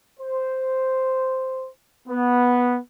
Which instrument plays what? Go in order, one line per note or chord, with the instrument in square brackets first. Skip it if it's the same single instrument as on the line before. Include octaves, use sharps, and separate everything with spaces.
[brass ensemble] C5
B3